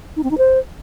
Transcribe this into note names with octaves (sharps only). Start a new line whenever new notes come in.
D#4
C4
D#4
C5